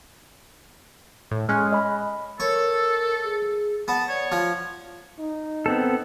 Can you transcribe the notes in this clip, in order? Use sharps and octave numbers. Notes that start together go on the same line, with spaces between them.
A2
G#3 C#4 F6 F#6
D#5 B5
A4 A#4 C#5
G#4
B3 A5
C#5 D5
F3 F4
D#4
B3 C4 A4